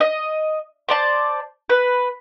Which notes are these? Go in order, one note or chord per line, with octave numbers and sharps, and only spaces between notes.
D#5
C5 D5 A5
B4